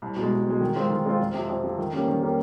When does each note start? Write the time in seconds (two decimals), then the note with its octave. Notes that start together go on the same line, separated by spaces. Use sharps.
0.02 C2
0.16 B2 G#3
0.32 C2
0.46 B2 G#3
0.61 D#3
0.76 G#3 C4 F4
0.90 D#3
1.05 G#3 C4 F4
1.19 F2
1.34 C3 F3
1.49 F2
1.63 C3 F3
1.78 D#3
1.93 G3 A#3 C#4
2.08 D#3
2.22 G3 A#3 C#4